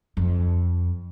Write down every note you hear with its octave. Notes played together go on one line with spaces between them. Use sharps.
F2